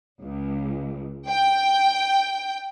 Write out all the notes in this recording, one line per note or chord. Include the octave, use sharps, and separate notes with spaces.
C#2
G5